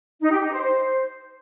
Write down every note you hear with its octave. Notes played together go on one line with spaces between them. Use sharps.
D#4
G4
D#4
C5
C5